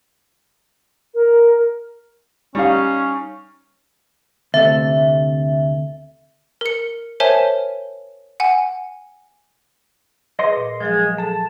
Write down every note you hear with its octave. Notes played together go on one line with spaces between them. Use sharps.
A#4
G3 C#4 D#4 F5
D2 C3 A3 E5
A#4 C#7
A#4 C5 C#5 E5 G#5 A5
F#5 G#5
G#4 B4 D#5 C6
A#2
F3 F#3 G#3 G#4
G#4 A4 A5